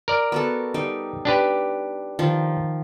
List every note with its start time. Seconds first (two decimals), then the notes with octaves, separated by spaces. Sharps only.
0.08 A#4 D5
0.32 B3 F#4 A4
0.74 G3 D#4
1.25 D4 G4 B4
2.19 D#3 F3